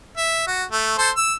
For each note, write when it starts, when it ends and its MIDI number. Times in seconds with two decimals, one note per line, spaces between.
0.17 0.43 76
0.47 0.64 66
0.72 0.96 57
0.98 1.10 69
0.98 1.10 72
0.98 1.10 84
1.16 1.34 88